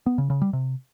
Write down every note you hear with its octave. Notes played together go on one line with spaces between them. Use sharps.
B3
C#3
C#3
G3
C3